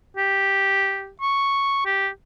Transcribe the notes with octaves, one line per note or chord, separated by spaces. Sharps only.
G4
C#6
G4